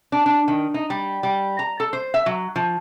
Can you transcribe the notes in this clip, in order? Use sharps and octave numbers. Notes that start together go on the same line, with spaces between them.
D4
D4
D#3
D#4
G3
G3
A#5
A4
C5
E5
F#3
F3